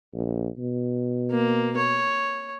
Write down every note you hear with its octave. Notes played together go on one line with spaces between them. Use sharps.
A#1
B2
A#3
C#5